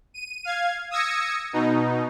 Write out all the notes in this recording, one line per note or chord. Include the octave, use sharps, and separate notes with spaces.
D#7
F5 G#6
D#6 E6 G#6 A#6 C#7
B2 D#4